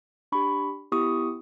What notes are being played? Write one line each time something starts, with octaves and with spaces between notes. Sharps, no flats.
D4 G4 B5 C#6
B3 E4 G4 C#6 D#6